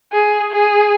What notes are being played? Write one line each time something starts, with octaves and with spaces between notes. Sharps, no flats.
G#4
G#4